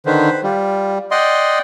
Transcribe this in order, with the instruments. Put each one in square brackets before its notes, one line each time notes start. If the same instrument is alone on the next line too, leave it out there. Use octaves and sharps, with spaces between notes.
[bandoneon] D3 D#3 [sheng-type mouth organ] B4 C5
[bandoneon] G3 [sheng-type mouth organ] F4
[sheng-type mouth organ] D5 F#5 G5 [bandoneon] D#5 C6